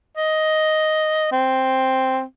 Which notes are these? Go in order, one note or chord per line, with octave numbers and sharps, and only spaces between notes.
D#5
C4